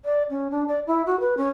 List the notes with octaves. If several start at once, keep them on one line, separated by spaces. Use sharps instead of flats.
D5
C#4
D4
D5
E4
F#4
B4
C#4